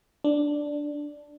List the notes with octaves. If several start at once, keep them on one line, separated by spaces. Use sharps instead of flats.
D4